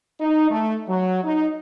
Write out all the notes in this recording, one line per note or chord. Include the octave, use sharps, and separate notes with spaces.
D#4
A3
F#3
D#4